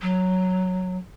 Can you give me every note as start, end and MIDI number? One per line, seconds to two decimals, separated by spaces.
0.02 0.97 54